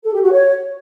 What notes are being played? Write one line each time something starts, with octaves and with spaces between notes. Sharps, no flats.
A4
G4
F#4
C#5